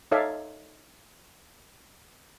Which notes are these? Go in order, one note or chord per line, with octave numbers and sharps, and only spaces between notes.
D#4 A4 C#5 D5 E5 F5